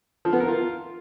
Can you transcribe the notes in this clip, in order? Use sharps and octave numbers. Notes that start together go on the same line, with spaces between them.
F3
B3
A#4
F4